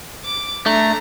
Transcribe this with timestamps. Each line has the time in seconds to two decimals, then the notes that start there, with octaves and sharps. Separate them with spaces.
0.25 D6
0.66 A3 D4 A#5